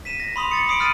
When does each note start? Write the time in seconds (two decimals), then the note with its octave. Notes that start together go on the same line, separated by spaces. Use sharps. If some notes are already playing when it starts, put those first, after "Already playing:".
0.05 B6 D#7 E7
0.20 A#6
0.36 B5 C6 D#6 F7 F#7
0.51 D6 A6 C#7
0.68 B5 D#6 C7 D7 F#7
0.80 B5 F6 F#6 A6 D#7